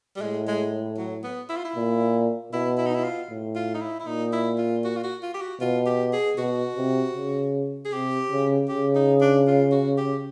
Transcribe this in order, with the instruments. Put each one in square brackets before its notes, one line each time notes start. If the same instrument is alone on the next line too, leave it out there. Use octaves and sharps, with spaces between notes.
[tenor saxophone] G3
[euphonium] A2 [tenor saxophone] G#3
[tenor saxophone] G#3
F#3
B3
E4
F4
E4
[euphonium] A#2
[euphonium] B2 [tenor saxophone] E4
[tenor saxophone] E4
D#4
E4
F4
[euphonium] A2
[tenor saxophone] F4
D#4
E4
E4
[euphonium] A#2 [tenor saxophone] D#4
[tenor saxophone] E4
F4
F#4
F4
F#4
F4
G4
F#4
[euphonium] B2 [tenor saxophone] F4
[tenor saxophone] G4
G#4
[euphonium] B2 [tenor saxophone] F#4
[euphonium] C3
C#3
[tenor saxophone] G#4
[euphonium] C3 [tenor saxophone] G4
[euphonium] C#3
[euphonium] C#3 [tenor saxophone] G4
[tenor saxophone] D#4
D4
F4
F#4
G4